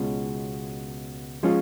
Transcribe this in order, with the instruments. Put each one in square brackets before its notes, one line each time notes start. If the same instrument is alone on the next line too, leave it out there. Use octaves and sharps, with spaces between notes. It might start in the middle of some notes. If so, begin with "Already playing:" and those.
Already playing: [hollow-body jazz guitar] C#2 B2 G#3 C#4 F4
F3 G#3 C#4 F4